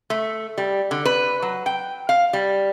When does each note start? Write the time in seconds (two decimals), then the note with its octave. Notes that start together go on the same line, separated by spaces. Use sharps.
0.10 A3
0.58 G3
0.91 D3
1.05 B4
1.42 F#3
1.66 G5
2.09 F5
2.33 G3